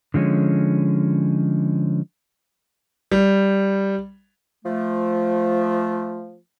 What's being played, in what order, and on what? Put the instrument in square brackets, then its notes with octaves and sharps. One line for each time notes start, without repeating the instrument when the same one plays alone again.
[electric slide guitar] D3 F3 G#3 C#4
[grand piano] G3
[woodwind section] F3 A3